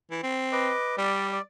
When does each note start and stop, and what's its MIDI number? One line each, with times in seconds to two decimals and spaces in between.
0.11 0.21 52
0.23 0.71 60
0.52 0.96 71
0.52 0.96 75
0.52 0.96 86
0.98 1.39 55
0.98 1.27 74
1.32 1.42 74